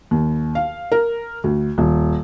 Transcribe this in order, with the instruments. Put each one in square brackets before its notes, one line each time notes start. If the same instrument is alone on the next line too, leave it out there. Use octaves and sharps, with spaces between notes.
[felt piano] D#2
F5
A#4
D2
D#1